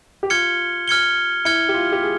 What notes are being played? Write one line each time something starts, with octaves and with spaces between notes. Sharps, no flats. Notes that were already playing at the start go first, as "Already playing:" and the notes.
G4
F4 F6 G#6 C#7 G7
F6 G#6 C#7 G7
E4 F6 G#6 C#7 G7
G4
F4
G4
G#4